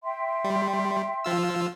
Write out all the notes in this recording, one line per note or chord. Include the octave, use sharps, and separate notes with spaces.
E5 G5 C6
G3
F3 F4 E6